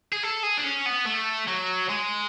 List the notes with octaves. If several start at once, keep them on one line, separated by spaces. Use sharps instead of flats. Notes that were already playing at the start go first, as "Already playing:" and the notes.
G#4
A4
G#4
D4
C#4
B3
A3
F#3
G#3